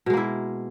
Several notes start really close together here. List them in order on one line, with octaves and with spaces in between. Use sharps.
B2 G#3 A#3 E4